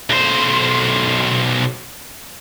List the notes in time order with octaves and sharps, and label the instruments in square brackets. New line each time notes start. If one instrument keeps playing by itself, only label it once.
[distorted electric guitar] B1 C5